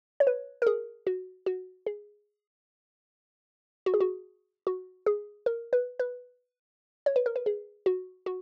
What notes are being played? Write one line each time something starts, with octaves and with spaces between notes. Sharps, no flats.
C#5
B4
A#4
G#4
F#4
F#4
G#4
F#4
G#4
F#4
F#4
G#4
A#4
B4
B4
C#5
B4
A#4
B4
G#4
F#4
F#4